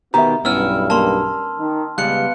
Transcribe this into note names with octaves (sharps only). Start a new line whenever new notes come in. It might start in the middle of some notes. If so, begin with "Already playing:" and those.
B2 D#3 B3 D#4 G4 E5 A#5
B1 G2 B3 C#4 E4 E6 F6
A#3 C#4 A5 C6
D#3
C#2 G3 G#3 B3 F5 F#6 C#7